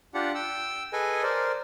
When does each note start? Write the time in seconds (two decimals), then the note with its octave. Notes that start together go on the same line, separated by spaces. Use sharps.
0.14 D4 F4 G4 F#5
0.35 G5 E6
0.93 G#4 A4 B4 D#5 G#5
1.23 A#4 C5 D5